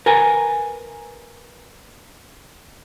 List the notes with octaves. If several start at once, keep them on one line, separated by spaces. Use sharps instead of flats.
A#4 B4 G#5